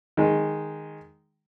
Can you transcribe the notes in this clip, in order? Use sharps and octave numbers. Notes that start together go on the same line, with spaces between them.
D#3 G#3